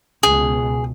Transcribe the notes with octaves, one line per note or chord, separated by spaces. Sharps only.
C#2 B2 G#4